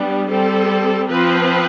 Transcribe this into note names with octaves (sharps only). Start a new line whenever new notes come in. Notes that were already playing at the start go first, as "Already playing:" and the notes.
Already playing: G3 B3 D4
G3 C4 A4
F3 C4 B4